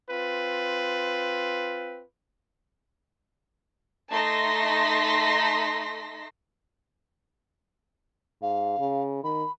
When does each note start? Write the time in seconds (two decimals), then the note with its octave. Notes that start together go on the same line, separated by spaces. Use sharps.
0.10 C4 F4 B4
4.10 A3 D#4 A5 C6 A#6 B6
8.42 G#2 F5
8.79 C#3
9.24 D#3 B5